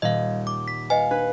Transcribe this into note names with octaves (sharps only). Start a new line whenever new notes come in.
D#1 D#5 F5
D6
B6
B4 D#5 F5 G#5
D4 B4